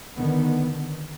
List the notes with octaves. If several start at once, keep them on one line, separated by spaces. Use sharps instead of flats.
D3 D#3 B3